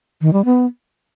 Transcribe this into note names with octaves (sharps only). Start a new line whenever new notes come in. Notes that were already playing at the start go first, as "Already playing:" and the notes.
D#3
G3
B3